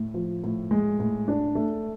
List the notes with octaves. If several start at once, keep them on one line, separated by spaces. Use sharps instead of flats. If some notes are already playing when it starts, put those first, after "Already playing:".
Already playing: A2
F3
A2
G#3
A2
D4
A3